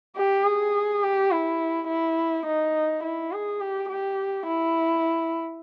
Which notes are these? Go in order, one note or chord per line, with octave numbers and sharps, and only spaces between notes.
G4
G#4
G4
E4
E4
D#4
E4
G#4
G4
G4
E4